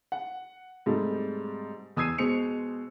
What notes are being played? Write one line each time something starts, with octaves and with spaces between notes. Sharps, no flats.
F#5
G#2 C3 G3 A3
E2 D#6 E6 G#6 C7 D#7
B2 G#3 C5 C#7 F7